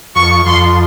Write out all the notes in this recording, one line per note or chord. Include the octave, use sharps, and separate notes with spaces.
F2 C#6
F2 C6